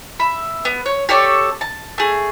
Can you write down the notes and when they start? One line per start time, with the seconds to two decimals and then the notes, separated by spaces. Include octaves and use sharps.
0.19 E5 B5
0.65 B3
0.86 C#5
1.09 G4 A4 C#5 D5
1.61 A5
1.98 A3 G#4